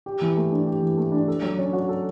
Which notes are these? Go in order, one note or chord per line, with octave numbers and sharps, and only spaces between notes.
G4
E3
A3
D4
G4
E3
A3
D4
A4
F#3
C#4
F#4
A4